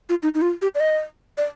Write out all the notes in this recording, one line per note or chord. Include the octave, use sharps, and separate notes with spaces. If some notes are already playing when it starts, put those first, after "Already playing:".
F4
D#4
D#4
F4
G4
D5
D#5
D5